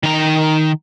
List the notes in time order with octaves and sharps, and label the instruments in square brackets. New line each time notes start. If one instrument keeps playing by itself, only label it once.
[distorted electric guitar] D#3 A#5